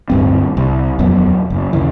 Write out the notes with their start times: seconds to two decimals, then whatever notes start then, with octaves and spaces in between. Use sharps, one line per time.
0.10 D1 G2 C4
0.57 C2
0.99 D#1 F2 F#3 B3
1.50 F#1
1.73 D#2 C#3 E3